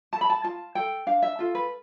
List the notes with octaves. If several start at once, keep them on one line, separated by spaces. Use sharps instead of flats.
A4 A5
B5
A5
F4 A5
A4 G5
D4 F5
E5
F4 A4
B4